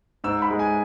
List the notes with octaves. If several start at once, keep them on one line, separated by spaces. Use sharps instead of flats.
G#2 E6
B5
G#3
G#5